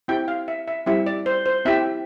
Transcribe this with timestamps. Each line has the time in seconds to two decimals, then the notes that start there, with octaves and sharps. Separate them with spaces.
0.08 C4 E4 G4 G5
0.28 F5
0.48 E5
0.68 E5
0.86 G3 C4 E4 G4 E5
1.06 D5
1.26 C5
1.46 C5
1.65 C4 E4 G4 E5